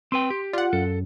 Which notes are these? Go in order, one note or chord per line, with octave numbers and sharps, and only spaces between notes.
C4 B4 G5 C6
G4
F4 D5 F#5
F#2 A4